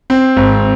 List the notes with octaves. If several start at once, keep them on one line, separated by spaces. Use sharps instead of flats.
C4
G#1